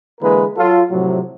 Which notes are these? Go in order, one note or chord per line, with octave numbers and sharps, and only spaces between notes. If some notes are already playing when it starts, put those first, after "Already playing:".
D3 E3 G#3 A#3 A#4 B4
F#3 F4 A4
A2 C3 F3 F#3